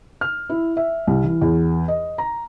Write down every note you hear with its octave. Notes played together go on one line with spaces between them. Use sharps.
F6
E4
E5
C2
E3
E2
D#5
A#5